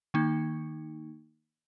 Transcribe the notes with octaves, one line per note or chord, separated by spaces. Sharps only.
D#3 A#3 D#4